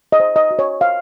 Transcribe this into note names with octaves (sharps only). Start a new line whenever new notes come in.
D#5
C5
D#5
F#4
C#5
C5 F5